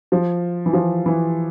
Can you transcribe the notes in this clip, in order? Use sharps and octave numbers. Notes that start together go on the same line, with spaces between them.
F3
E3
F3
E3